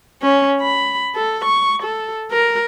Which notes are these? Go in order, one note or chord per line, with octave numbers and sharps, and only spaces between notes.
C#4
B5
A4
C#6
A4
A#4